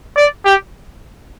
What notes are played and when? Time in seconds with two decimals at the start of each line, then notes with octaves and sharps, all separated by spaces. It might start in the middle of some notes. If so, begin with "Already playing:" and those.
0.16 D5
0.45 G4